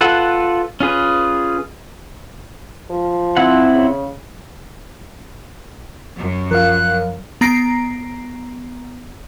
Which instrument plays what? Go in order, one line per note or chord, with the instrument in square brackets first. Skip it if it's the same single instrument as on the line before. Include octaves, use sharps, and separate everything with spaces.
[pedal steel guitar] F4 A4 B4 F#5
C#4 F4 G#4 B4
[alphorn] F3
[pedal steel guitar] C4 E4 F#5
[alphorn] C#3
[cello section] F#2
[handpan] F3 [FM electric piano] A#4 F5 [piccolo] F#6
[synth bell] B3 A#5 A#6 C7 D7